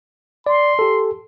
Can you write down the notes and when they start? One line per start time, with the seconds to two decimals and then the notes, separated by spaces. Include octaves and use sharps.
0.46 D5 C6
0.79 G4 A4